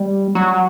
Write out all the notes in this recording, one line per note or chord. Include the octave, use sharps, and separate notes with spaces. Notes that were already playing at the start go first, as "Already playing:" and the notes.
Already playing: G3
F#3